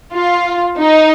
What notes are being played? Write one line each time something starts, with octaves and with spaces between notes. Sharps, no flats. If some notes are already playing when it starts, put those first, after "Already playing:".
F4
D#4